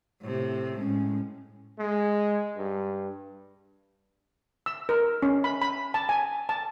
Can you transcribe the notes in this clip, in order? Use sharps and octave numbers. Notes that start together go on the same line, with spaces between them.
A2 C3
A2 G#3 C#4
G#3
G2
E6
A#4
C#4
B5
B5
A5
G#5
A5